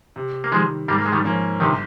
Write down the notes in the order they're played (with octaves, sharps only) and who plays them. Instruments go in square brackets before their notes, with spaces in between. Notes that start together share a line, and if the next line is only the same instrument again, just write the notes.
[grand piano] C3
[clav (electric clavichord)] A#3
[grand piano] D#3 G3 [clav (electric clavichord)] F3 G#3
[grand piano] G#2 [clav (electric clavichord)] G3 A#3
[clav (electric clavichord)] A#3
G#3
D#3 G3
[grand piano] F3 A#3 C#4
[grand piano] G1 [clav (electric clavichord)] C3 D#3